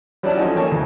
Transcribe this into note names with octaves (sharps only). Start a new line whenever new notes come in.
F#3 G3 C#4 E4 D5 A5
F3 F#3 A3 C#4 D#4 F#4
A3 A#3 C#5 G5 A5
D2 G#5